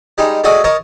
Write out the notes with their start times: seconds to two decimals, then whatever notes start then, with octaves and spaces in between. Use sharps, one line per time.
0.18 G3 G#3 D#4
0.44 A3 F#4 G#4 D5 D#5
0.64 A#4 C#5 D#5 A5